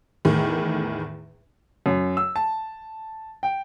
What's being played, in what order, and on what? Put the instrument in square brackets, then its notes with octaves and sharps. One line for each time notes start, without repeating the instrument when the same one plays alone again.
[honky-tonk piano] E2 A2 D#3
[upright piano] F#2
E6
A5
G5